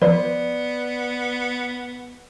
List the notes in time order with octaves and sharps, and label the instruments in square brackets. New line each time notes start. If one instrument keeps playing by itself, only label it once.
[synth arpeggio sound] F3 B4 C5 [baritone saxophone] B3 [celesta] D5